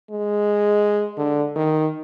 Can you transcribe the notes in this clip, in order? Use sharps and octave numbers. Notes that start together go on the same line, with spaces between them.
G#3
D3
D#3